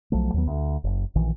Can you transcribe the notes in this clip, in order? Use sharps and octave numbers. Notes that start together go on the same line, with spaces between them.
B1 F3 F#3 A3
D#2 F#3 B3
D2
F#1
A#1 D#3 E3